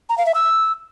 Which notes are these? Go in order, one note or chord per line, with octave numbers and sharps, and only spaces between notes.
A#5
F5
E5
E6